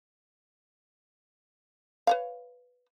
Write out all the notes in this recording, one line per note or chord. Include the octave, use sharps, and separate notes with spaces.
B4 C#5 F5